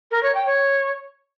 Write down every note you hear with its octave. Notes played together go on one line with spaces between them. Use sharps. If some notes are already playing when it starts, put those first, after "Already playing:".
A#4
C#5
G5
C#5